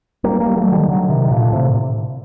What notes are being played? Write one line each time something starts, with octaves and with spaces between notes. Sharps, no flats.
G3 A#3
G3 A#3
F#3 A3
D#3 G3
D3 F#3
C3 D#3
A#2 D3
A2 C3